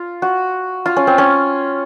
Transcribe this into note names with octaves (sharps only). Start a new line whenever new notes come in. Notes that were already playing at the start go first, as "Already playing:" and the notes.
Already playing: F4
F#4
F4
C#4
C4
C#4